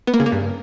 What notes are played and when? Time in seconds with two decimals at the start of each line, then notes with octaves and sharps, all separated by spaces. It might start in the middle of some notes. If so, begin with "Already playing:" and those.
0.07 B3
0.14 A#3
0.20 C#3
0.26 A#3
0.32 G2